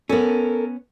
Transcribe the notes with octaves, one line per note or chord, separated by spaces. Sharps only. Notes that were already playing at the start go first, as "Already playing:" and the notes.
B3 C#4 A4 A#4